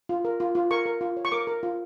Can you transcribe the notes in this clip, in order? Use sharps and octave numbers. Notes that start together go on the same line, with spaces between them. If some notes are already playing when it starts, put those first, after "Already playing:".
F4
A#4
F4
F4
A#4 C#6
A#4
F4
C#5
C#6
A#4 D6
A#4
F4